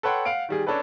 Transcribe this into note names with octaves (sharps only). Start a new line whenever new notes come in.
A4 B4 C#5 F#5 G5 C6
F5 F#5 D7
D#3 G3 G#4
C#4 D4 A4 B4